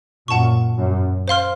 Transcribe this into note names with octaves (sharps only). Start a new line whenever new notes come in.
F#2 A#2 F#5 A5 C#6
F#2
C5 F5 C6 F6